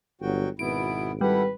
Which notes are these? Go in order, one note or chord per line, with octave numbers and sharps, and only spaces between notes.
G1 F#3 F#4 G5
G#1 B2 B3 E4 D7
G3 E4 A4 B4 F#5